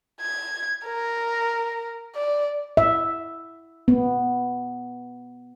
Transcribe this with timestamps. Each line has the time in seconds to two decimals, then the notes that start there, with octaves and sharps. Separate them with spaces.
0.21 G#6
0.85 A#4
2.15 D5
2.77 E5
3.88 B3